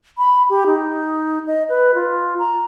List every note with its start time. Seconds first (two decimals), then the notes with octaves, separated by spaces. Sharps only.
0.18 B5
0.49 G4
0.66 D#4
1.47 D#5
1.69 B4
1.95 F4
2.39 A#5